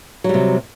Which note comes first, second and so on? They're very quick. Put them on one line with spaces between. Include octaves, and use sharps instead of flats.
F#3 G3 C3